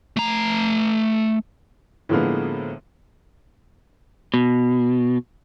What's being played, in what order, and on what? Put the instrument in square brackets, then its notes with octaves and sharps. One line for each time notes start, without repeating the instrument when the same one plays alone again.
[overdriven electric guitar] A3 A#5
[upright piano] A2 D3 F3 G#3 A#3 B3
[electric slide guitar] B2